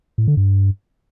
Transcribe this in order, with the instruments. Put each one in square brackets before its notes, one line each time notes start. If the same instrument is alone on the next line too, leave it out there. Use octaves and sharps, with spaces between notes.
[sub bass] A2
D3
G2